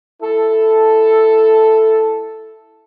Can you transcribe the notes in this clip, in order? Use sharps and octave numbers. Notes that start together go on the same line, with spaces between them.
E4 A4